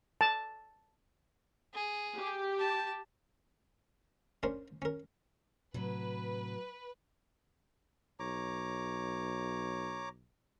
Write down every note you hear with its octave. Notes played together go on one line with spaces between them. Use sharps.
A5
G#4
G4
A5
C#4 D4 A#4 C5
C#4 A#4
A2 C3 F#3 B4
B1 C#5 A#5 D6